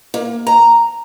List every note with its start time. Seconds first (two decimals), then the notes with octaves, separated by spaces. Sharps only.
0.14 A#3
0.47 A#5